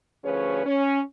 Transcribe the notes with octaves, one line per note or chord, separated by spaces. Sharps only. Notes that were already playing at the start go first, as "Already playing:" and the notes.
D2 F3 C#4 G#4 B4 C#5
C#4